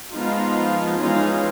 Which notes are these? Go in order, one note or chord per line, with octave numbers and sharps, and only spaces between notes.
F3 G#3 B3 D#4 F4
E3 G#3 C#4 D#4 F4